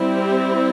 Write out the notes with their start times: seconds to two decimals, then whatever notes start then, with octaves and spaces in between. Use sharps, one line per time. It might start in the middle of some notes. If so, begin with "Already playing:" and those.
Already playing: G3 C4 E4
0.13 G4